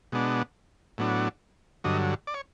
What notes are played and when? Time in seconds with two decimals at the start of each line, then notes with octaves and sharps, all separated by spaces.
0.12 B2 G#3 B3 D4
0.98 A2 F#3 B3 D4
1.84 G2 D3 F#3 D#5
2.27 D5
2.34 C#5